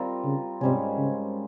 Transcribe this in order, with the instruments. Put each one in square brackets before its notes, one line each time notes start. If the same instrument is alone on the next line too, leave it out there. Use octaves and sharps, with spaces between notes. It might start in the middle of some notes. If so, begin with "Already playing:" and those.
Already playing: [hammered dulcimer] G3 C4 F4 A#4
[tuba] C#3
[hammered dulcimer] G#2 G3 C#4 [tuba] C3
[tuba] C#3